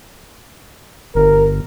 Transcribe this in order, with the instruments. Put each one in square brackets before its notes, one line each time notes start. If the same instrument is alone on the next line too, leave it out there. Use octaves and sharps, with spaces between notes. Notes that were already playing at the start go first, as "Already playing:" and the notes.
[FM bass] G1 [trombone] A#4